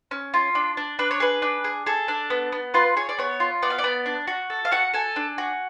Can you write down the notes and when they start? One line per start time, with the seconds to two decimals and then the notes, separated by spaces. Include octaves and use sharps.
0.11 C#4
0.34 F4
0.55 D4
0.77 D4
0.99 D4 B4
1.11 C#5
1.20 G#4 B4
1.42 D4
1.64 G#4
1.86 G#4 A4
2.08 D4
2.30 B3
2.52 B3
2.74 F4 B4
2.97 G#4 C#5
3.09 D5
3.18 B3 C#5
3.40 F4
3.63 B3 D5
3.70 F5
3.78 D5
3.84 B3
4.06 D4
4.28 F#4
4.50 A4
4.65 F5
4.71 F#4 F#5
4.94 A4 G#5
5.16 D4
5.38 F#4